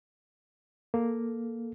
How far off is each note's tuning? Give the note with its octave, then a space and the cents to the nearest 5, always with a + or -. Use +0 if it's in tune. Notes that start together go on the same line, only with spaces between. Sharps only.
A#3 +0 A4 +0